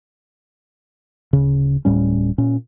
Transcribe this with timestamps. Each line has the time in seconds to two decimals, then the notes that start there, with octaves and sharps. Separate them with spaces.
1.33 D1 C#3
1.85 D1 A2 G3 C#4
2.38 A#2 C#4